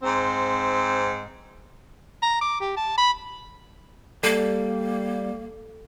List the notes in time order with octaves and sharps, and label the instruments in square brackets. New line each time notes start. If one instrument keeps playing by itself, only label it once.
[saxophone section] G#2 C4
[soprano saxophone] A#5
D6
G4
A5
B5
[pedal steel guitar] G3 [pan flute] A#3 [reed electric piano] A4